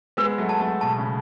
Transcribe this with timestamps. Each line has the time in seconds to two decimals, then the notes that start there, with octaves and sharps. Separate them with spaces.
0.17 G#3 B3 B4
0.38 F#3 A3
0.49 A5
0.60 F#3 A3
0.81 B2 A5
0.98 C#3